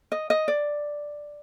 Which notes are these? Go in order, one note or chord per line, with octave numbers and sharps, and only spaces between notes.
D#5
D#5
D5